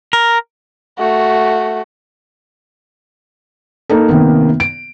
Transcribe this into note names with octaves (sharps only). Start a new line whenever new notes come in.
A#4
A3 F#4
A#3 D#4 A4
C3 D#3 A#3 B3
D7